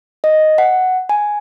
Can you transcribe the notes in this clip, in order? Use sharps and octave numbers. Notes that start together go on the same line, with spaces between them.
D#5
F#5
G#5